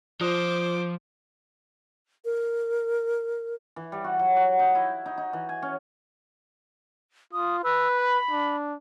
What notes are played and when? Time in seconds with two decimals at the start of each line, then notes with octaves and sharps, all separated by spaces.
0.21 F3 F4 C5 D5 D6 D#6
2.25 A#4
3.76 E3
3.92 G3
4.04 F#4
4.19 F#3
4.36 F#4
4.59 D#4
4.75 E4
5.06 D#4
5.18 D#4
5.33 E3
5.49 G#5
5.62 C#4
7.33 F4 D#6
7.64 B4 E6
7.97 B5
8.31 D4